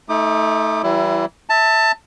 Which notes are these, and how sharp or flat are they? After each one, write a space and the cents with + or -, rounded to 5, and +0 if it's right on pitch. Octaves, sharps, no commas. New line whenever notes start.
A3 +0 D#4 +35 D6 +40
E3 +0 G3 -35 E4 +20
E5 -15 A5 +15